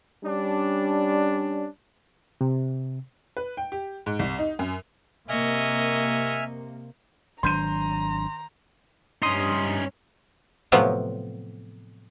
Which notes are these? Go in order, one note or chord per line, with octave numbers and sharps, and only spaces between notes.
G3 C#4 D4
C3
B4
G5
G4
G#2
C2
D#4
F#2
C3 A#3 D#5 E5 G#5 C#6 F6
G#1 D#3 F#3 D4 A#5 C6 G6 D#7
G2 C#4 D#4 C6 D#6
A2 C3 F3 F#3 B3